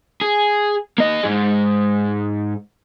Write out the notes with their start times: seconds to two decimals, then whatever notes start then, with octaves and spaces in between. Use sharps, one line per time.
0.21 G#4
0.98 A#3 D#5
1.23 G#2 G#3